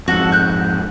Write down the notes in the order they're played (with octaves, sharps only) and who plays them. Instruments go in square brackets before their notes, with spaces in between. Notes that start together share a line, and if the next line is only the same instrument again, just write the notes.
[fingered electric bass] F2 G#2 [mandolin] F#4 A4 F#5
[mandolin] F#6 G6